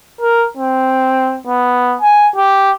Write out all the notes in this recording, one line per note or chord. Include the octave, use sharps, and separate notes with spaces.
A#4
C4
B3
G#5
G4